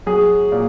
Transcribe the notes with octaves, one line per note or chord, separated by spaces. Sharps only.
F#3 G#4
A#2